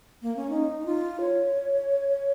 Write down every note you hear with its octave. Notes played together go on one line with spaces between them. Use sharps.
A#3
C#4
D#4
F4
C#5